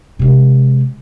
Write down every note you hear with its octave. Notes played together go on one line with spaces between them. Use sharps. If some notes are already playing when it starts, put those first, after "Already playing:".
C3 G#3